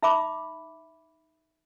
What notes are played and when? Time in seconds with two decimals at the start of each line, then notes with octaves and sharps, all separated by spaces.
0.03 D#4 E5 B5 D6